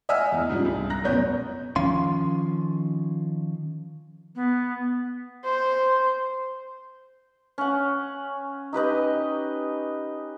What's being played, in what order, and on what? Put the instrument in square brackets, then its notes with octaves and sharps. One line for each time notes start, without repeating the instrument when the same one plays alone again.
[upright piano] D#5 E5 F#5 G#5 E6 F6
E2
G#2 C#3 F3 G3 D4
C2
A#5 F#6 A#6
F1 F#2 B2 B3 C#5 G6
[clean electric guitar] D#3 F3 C#4 F5 C6
[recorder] B3
[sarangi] C5
[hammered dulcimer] C#4 F#5
D#4 G4 B4 D#5